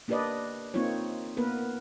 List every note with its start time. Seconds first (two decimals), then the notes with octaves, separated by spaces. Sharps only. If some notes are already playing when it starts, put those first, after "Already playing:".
0.08 A#3 D4 G4 B4 D5 D#5
0.74 A#3 C4 D#4 F4 C#5
1.37 A#3 B3 A#4 B4